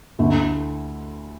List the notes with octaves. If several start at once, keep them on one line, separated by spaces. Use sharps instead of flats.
D2 D3 A3 E4